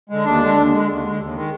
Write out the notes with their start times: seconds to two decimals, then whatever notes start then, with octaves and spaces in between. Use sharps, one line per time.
0.09 D3 G#3
0.25 D#2 D4
0.40 D3 G#3
0.56 D#2
0.72 D3 G#3
0.88 D#2
1.03 D3 G#3
1.20 D#2
1.34 D#3 G#3